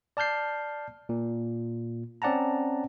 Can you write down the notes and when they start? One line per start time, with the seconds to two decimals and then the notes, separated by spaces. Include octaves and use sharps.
0.17 D5 A5 F6 G6 C7
1.09 A#2
2.22 C4 C#4 D5 F#5 A5 A#5